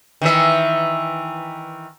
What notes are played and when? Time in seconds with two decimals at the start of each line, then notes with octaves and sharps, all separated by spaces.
0.22 D#3 E3 E5